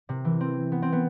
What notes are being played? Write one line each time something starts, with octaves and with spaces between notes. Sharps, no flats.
C3
E3
C4
B3
C4
B3